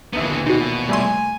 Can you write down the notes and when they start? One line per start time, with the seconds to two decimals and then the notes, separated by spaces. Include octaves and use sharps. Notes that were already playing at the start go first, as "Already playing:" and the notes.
0.13 A#1 D#2 D3 E3 B3
0.47 B2 D#4 F#4
0.89 G3 A3 G#5 C6